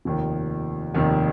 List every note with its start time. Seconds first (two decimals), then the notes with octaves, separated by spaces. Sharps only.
0.05 F1 D#2 D#3
0.94 F1 D#2 D#3